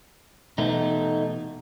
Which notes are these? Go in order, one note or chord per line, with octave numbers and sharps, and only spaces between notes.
B2 E3 A3 B3 D#4